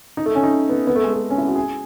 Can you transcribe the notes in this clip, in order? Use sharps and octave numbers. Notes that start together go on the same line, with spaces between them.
D#4
A3
C#4
D#4
B3
B3
A3
G#3
A3
C#4
E4
F#4
G#4